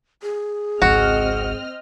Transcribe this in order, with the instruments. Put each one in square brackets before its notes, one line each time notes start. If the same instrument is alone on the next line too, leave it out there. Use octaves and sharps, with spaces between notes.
[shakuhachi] G#4
[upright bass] G#1 C#2 [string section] C4 D#5 F6 [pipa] F#4